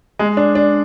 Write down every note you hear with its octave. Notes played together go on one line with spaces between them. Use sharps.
G#3
D4
D4